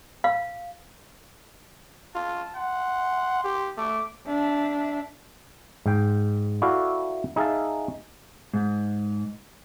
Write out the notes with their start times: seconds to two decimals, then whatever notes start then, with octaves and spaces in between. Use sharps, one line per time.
0.24 F5
2.15 F4 A5
2.55 F#5 C6
3.44 G4
3.77 A3 D6
4.26 D4 E5
5.86 G#2 G5
6.62 E4 F#4 A4 D5 E5 F5
7.36 D#4 G#4 E5 F5 A5
8.53 G#2